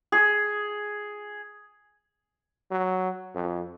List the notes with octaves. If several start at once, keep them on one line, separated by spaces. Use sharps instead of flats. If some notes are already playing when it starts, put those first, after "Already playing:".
G#4
F#3
F2